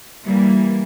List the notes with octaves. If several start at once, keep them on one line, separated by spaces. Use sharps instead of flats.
E3 G3 A#3